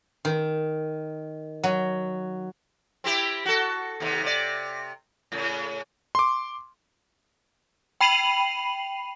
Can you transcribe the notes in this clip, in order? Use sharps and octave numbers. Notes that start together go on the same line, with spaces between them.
D#3
F#3
C4 E4 G4
F#4 A4
D#2 C3
C3 D5
A2 C#3
C6 D6
G5 B5 C7 D#7 F7 F#7